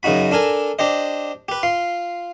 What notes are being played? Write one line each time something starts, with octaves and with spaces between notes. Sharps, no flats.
F#2 C#3 D#4 F#4 B5
D4 A4 A#4 G#5
D4 G4 C5 D#5
G4 B4
F4 C6